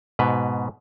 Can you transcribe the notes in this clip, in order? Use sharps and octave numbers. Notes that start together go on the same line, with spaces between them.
G#2 B2 B4